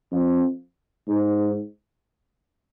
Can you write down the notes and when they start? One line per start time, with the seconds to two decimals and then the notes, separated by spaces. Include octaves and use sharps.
0.12 F2
1.08 G#2